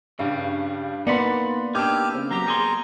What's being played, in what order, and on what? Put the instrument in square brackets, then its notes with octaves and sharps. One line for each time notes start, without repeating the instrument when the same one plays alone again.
[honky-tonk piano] G2 F5 [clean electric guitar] C#3 G3
[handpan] A#3 B3 [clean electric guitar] D#4 F#5 B5 [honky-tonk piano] D5 C6
[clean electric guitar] D4 D#4 [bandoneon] G4 F6 G6 [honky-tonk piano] D6 E6 G#6
[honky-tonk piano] C#3 C4
[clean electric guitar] F#3 G4 [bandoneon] A#5
[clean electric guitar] G3 G#4 C6